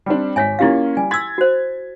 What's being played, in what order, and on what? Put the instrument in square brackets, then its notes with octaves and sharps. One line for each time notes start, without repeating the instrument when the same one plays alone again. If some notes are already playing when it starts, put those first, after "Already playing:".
[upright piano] G3 C4 D4
[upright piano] G#1 B6 [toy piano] C#5 E5 G#5
[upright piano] A#3 C#4 F4 [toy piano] E4 G4 F5
[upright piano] G3 [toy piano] G#5
[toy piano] C6 E6 [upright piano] G#6 A6 B6
[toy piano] F#4 C5